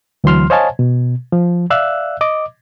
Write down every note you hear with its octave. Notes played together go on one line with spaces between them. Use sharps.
D2 E3 F#3 C6 F6
C5 C#5 D#5 F5 G#5 A5
B2
F3
D5 E5 F5 E6 F#6
D#5 D6